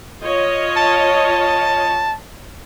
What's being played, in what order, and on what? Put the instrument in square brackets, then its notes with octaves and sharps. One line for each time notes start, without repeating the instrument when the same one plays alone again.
[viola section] F4 C#5 D#5
[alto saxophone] A5